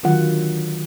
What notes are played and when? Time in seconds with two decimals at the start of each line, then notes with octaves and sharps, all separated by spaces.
0.03 D3 D#3 F#3 F4 F#5